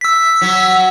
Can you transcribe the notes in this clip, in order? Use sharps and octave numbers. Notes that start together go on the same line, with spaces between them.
E6 B6
F#3